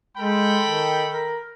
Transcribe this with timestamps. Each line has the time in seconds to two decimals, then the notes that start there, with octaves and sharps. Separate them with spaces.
0.17 G#3 A4 G5 B5
0.64 D#3
1.11 A#4